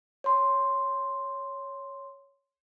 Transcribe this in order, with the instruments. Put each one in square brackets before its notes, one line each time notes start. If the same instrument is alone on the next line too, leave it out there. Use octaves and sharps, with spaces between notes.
[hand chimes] C#5 C6